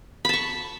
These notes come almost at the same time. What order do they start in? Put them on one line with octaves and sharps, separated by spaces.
B5 A5 C#6